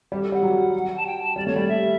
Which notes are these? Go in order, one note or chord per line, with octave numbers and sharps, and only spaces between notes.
G3 G4
A4
G3 F#5
F#3
A5
G5
A5
G3 D5
A3 C#5
G3 D5
E5